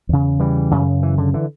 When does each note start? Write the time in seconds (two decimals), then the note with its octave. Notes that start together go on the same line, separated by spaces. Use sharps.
0.09 E2 C#3
0.40 E3 G3
0.71 F#2 C#3
1.03 E3
1.18 D3
1.34 D3 E3